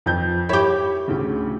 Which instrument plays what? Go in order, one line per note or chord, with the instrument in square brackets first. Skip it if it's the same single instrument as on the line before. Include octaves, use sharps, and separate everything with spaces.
[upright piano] F2 G6
[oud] E4 G4 [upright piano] C#5
[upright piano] D2 A2 C#3